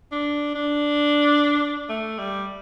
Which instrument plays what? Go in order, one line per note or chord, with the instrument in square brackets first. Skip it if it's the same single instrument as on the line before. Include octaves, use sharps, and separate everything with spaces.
[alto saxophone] D4
D4
A3
G3